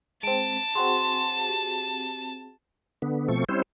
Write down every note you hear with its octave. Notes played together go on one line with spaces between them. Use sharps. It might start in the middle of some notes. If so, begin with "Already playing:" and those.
G#3 C4 A5 D7
C4 F#4 G#4 C6
G4
D3 B3
B2 F3 A3 C4 C#6
G3 C4 C#4 E4 C5